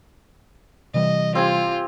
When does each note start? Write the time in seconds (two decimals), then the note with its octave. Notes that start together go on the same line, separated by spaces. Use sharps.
0.94 C3 E3 G3 D#5
1.35 C4 F4 G4 G#5